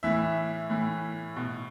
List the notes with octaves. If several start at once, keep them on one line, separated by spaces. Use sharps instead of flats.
A2 E3 E5
A2 E3
B2